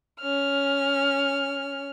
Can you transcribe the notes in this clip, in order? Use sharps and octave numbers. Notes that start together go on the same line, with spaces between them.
C#4 F6